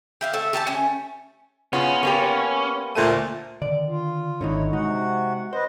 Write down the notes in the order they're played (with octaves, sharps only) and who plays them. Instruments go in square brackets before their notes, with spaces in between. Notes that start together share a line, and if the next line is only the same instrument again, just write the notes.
[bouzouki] G4 E5 F5
A3 A4 E5
G4 A4 G#5 A5
A3 C#4
[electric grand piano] C#3 F4 C6 [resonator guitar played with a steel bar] B3 [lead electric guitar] C#4
[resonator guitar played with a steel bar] A#3 B3 G4 [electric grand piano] C6 C#6
[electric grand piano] D2 C5 D#7 [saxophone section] A#2 A3
[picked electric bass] D3 D#3 [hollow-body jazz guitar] D5
[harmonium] F4
[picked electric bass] G#1 G#2 [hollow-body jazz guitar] D3 D#3 D#4 [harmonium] E4 C#5
[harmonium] C3 F#4 F#5 [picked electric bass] G#3 [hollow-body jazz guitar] D#4
[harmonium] B4 D#5 [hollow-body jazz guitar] C5